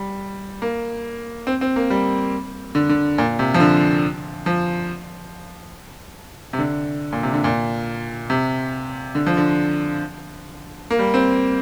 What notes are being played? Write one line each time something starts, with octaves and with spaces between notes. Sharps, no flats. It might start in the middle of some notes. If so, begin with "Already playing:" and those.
Already playing: G3
A#3
C4
C4
A#3
G3
D3
D3
A#2
C3
F3
D3
F3
C3
D3
A#2
C3
D3
A#2
C3
D3
F3
D3
A#3
G3
C4